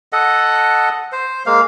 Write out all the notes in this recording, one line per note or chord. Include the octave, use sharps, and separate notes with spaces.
A4 D#5 F#5
C5
G#3 A#3 F5